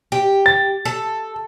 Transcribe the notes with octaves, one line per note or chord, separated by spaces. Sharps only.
G4
A6
A4